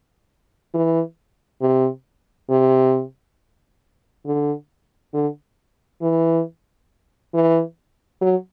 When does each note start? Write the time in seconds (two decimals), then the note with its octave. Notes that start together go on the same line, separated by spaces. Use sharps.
0.74 E3
1.61 C3
2.50 C3
4.26 D3
5.14 D3
6.02 E3
7.34 E3
8.21 F#3